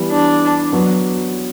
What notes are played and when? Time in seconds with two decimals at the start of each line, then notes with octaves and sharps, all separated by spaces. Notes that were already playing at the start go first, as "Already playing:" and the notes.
Already playing: E3 G3 B3 E4 G4
0.10 D4
0.72 F#3 B3